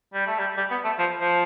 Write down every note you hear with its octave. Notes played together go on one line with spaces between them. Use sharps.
G3
A3
G3
G3
B3
A3
F3
F3